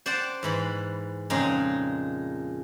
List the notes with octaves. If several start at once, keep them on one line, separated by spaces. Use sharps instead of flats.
C5 D5 F#5 G5 A5
G#2 E3 B5
F2 A#2 C#3 G#3 D#4